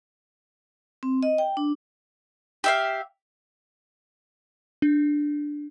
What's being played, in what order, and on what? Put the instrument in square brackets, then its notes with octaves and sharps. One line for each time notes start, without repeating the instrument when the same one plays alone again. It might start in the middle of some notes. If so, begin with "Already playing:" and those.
[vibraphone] C4
D#5
G5
D4
[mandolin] G4 E5 F5
[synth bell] D4